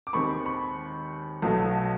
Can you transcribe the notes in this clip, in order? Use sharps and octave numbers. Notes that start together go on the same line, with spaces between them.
D6
D#2 D#3 G#3 C4 B5 C#6
B5 C#6
B1 B2 F#3 A3